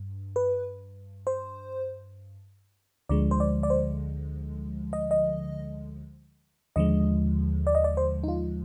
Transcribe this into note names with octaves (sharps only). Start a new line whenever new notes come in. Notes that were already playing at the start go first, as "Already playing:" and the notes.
Already playing: G2
B4
C5
D2 D3 F3 G#3 D5
C5
D5
D5
C5
D#5
D#5
D#2 D3 F3 G#3 D#5
D5
D#5
D5
C5
D#4
F4